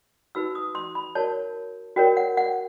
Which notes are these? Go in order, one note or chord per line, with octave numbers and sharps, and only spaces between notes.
D#4 F#4 B4 E6
D#6
C6
B5
F#4 A#4 C#5 A5
F#4 A#4 C#5 G5
F#5
F#5